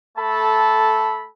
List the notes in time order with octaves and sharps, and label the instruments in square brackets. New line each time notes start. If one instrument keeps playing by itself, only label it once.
[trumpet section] A3 A4 A5 B5